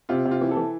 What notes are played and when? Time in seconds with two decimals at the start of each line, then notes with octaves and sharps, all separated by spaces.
0.09 C3 F4
0.25 C3
0.31 F4
0.41 E3
0.51 A4
0.57 E3